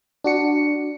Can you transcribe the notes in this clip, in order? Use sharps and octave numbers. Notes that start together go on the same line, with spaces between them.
D4 F#4 C#7